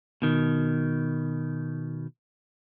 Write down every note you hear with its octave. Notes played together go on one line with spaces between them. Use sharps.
B2 D#3